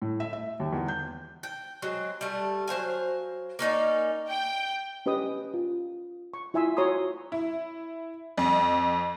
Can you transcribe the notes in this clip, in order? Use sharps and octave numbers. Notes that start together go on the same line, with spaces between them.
A2
E5
E5
D#2
E2
G6
G5
F#3 G#3 C4
G3 A3
F#3 C5 F5 G#5
A#3 C#4 D#4 D5
G5
C#4 G4 B4 D#5 D#6
F4
C#6
E4 F4 E5 G#5 C6 E6
F#4 C#5 A#5 C6 D#6
E4
F2